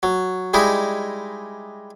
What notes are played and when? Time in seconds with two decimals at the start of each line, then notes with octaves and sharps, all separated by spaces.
0.03 F#3
0.54 G3 G#3 D#4 E4